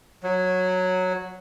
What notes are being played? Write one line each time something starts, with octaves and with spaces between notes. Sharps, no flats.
F#3